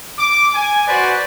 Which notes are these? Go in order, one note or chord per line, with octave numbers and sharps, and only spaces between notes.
D6
G#5
F#4 B4 C5 D5